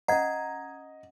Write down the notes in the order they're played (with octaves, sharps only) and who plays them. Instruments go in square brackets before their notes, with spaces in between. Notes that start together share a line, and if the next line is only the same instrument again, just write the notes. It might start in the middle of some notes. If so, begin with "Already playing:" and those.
[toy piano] C#4 F#5 [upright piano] D#5 [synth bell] A#5 G#6